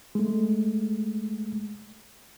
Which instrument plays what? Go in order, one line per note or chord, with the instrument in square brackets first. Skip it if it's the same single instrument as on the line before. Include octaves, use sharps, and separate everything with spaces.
[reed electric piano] G#3 A3